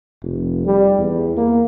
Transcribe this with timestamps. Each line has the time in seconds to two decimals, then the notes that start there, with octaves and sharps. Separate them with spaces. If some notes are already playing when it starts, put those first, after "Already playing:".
0.22 F1
0.66 G3
0.98 E2
1.37 A#3